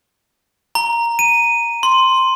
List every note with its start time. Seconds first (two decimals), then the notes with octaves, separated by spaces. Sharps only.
0.75 A#5
1.19 D#7
1.83 C6